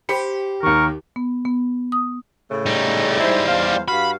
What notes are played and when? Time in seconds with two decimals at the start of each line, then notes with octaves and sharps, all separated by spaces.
0.09 G4 C5 B5 C#7
0.63 D#2 D#3 A#4 C#6
1.16 B3
1.45 B3
1.92 D#6
2.51 A2 C#3 A3
2.66 G3 D#4
3.20 G#2 E4 C5
3.47 E2 C5 F5
3.88 G2 F#4 F5 B5